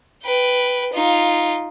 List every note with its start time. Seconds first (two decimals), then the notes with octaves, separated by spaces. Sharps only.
0.24 B4 G5
0.93 D#4 F4